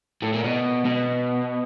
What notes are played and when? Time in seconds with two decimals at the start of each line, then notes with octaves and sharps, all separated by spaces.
0.22 A2
0.33 A#2
0.44 B2
0.85 B2